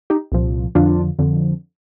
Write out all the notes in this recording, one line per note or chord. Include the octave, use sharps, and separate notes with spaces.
D#4 G4
C2 A#2 F3
F2 D3 F3 D4 F4
F2 D3 F3